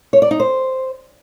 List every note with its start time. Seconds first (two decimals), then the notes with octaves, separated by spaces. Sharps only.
0.13 C#5
0.22 D5
0.31 D#4
0.40 C5